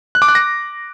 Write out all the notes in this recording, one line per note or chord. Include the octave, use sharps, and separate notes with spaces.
F#6
D6
F#6
A#6